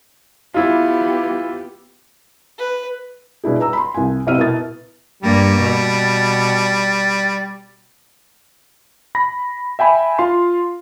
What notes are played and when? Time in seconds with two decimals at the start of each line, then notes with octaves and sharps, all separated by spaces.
0.54 B3 E4 F4 G4
2.58 B4
3.44 B2 D4 E4 G#4
3.60 B4 A#5 E6
3.73 B5 C6
3.94 C2 G#5
4.27 B1 C3 E4 E5 F6 D#7
4.38 B2 E4 A#4 D#6 A6
5.23 G2 G3 A#3
5.60 B2
9.15 B5 A#6
9.79 E5 G5 G#5 B5
10.19 F4 F5 C6